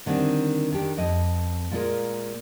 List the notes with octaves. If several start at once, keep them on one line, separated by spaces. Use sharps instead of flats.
D3 D#3 G3 C4
D#3 D4 G4
F2 D#5
A#2 G#3 F4 A#4